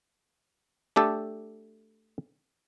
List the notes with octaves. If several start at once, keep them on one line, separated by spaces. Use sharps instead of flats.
A3 D4 G4 A4